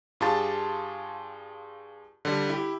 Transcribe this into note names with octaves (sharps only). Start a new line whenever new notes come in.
G2 F4 G4 G#4 A5 A6
D3 G3
E4 G4